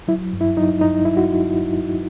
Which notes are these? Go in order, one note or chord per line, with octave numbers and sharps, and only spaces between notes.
F#3 E4
G2
E4
F#3 D#4
G2 D#4
F#3 E4
F#4